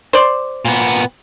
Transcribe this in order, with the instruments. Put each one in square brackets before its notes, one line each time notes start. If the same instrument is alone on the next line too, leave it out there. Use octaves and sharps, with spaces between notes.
[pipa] C5 D5
[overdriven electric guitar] A#2 B3